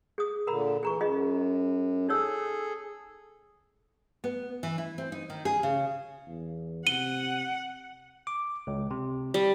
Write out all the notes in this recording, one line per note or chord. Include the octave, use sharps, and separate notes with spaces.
G#4 D#6
A#2 D3 A#4 A#5 B5
E3 G#4 A#5 C#6
F#2 F4 G#4 D#5
D#4 G#4 A4 C#5 E6
B3
E3
E4
C4
D#4
D#3
G#4
C#3
E2
C3 F#5 D#7 G7
D6
C#2
C3
G3